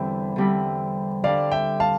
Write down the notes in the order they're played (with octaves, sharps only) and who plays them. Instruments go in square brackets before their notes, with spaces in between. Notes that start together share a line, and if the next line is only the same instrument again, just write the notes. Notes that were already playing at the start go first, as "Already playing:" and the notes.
Already playing: [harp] E2 D3 G3 C4 E4 [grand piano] E5
[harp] E2 D3 G3 C4 E4
[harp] D3 G3 D4 [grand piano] D5 F5
[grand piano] E5 G5
F5 A5